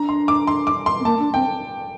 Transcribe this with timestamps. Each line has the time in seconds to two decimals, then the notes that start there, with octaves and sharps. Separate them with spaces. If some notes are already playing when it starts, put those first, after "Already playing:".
Already playing: D4 A#5
0.09 C6
0.28 D6
0.47 C6
0.67 D6
0.86 C6
1.00 C4
1.05 A#3 A5
1.20 D4
1.34 C4 G5